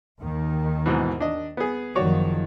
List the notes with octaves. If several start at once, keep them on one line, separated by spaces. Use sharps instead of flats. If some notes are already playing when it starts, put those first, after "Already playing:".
D#2 D#3
G#2 B2 E3
D4 D#5
B3 G#4
F#1 D#3 F3 F#4 C#5 D5